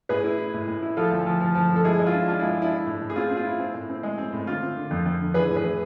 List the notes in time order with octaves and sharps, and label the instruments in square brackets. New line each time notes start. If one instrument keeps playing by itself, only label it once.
[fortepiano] A2 G#4 B4
E4
E4
A2
A2
E4
F3 F4 A4
D2
F3
F3
F3
F3
A4
G#3 E4 G#4
G#3
F4
D4
D4 F4
G#3 E4
D4 E4
E4
A2
A2
G#4
C4 F4
C4
F4
E4
C4
A2
C4
G#3
C4
A2
D3 F4
C4
D3
F2
F2
D3
E3 G#4 B4
A2
G#4 B4
E3